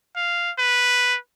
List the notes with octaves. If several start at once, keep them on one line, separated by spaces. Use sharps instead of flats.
F5
B4